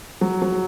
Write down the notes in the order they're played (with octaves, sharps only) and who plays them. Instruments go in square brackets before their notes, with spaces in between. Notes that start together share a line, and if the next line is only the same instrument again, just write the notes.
[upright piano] F#3
F#3